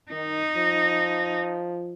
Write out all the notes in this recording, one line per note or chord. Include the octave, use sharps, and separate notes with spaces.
D#3 D#4
F3